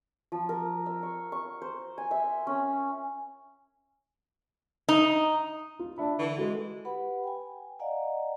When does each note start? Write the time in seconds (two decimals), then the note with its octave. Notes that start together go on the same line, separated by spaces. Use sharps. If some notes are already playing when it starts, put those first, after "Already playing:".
0.32 F3
0.49 A#4
0.86 E6
1.03 C#6
1.32 C#6
1.62 C5
1.98 G#5
2.11 E5
2.47 C#4
4.89 D#4
5.79 F4
5.98 D4 D5 E5 B5
6.19 D3 E3
6.38 G#3 F#4 A4
6.85 G4 B4 F#5 B5
7.24 G5 G#5
7.79 D5 D#5 F5 F#5 G#5 A#5